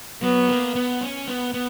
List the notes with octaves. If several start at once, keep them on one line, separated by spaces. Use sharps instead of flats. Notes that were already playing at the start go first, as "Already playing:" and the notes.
F#3 B3
A#3
B3
C#4
B3
B3